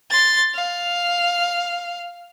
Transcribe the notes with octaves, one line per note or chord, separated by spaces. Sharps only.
C6 A6
F5